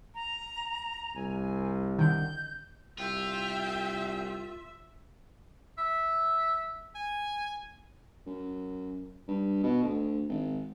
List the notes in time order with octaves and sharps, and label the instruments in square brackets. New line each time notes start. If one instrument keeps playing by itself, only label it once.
[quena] A#5
[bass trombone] C2 [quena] G#5
[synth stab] D3 D#3 [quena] G6
[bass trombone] C2 [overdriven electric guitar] F4 [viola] E5 [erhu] G5
[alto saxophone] E5
G#5
[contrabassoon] F#2
G2
B2
D2
G#1